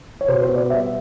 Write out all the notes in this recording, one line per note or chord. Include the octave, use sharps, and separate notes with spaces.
C#5
B2 C5
C5
B3
D5
G3 E5